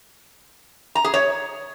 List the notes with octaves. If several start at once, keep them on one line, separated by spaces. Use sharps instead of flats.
A#5
G#4
C#5